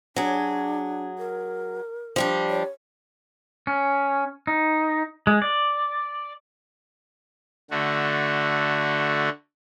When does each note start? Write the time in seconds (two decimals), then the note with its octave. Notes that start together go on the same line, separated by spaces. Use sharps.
0.16 F#3 D4 G#4
1.18 A#4
2.16 F3 G3 D4
2.49 C#5
3.67 C#4
4.47 D#4
5.27 G#3
5.42 D5
7.71 D3 A3 F#4